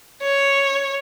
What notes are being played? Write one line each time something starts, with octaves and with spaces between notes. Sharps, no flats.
C#5